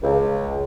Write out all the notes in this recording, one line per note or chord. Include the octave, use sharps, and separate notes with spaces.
C#2